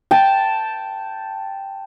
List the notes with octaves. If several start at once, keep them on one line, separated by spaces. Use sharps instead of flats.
G5 A5